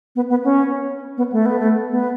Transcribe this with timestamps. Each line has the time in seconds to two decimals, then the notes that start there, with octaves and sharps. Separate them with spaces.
0.16 B3
0.30 B3
0.44 C#4
1.17 B3
1.32 A3
1.46 B3
1.59 A3
1.90 B3